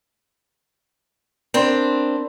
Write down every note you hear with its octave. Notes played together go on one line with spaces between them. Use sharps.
C4 D4 A#4 B5 C6